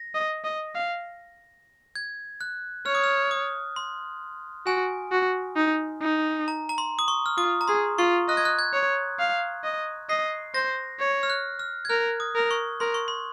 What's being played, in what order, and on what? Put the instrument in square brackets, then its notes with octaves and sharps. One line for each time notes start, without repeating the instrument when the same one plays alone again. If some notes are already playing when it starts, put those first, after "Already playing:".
Already playing: [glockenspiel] A#6
[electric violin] D#5
D#5
F5
[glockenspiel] G#6
F#6
[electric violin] C#5 [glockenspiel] F6
[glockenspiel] D#6
F6
D#6
C6
[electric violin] F#4 [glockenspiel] G#5
[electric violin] F#4
D#4
D#4
[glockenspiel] A#5
A#5
C6
D#6
C#6
F6
[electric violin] F4 [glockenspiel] D#6
[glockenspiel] A#5
[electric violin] G#4 [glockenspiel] C6
[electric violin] F4 [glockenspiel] C#6
[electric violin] D#5 [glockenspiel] F#6
[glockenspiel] G#6
F#6
G#6
[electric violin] C#5
F5
D#5
[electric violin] D#5 [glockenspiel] C7
[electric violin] C5 [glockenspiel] A#6
[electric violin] C#5
[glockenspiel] F6
F#6
F6
G#6
[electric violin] A#4 [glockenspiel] F#6
[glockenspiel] D#6
[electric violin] A#4
[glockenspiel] C#6
[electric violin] A#4 [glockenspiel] C6
[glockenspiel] C#6
C6